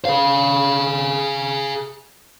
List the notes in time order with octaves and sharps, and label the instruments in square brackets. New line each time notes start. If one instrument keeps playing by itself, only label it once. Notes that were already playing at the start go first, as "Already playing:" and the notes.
[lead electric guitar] G#4 F5